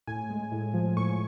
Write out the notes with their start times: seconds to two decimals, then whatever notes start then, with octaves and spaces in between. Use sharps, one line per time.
0.07 A2 G#5
0.30 G#3
0.52 A2
0.74 F3
0.97 A2 C#6